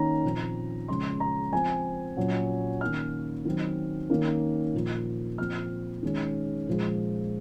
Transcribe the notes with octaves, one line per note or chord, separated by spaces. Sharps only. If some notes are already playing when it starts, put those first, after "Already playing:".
Already playing: D#3 A#3 C#4 A#5
A#2 F3 C4
C#3 F3 G#3 C#4 C6
A#5
F3 C4 G#5
A#2 F#3 C#4
D#3 A#3 C#4 F6
D#3 F#3 C4
D#3 A#3 C#4
A#2 F3 A#3
A#2 F3 C4 F6
D#3 G#3 C#4
A#2 F3 G#3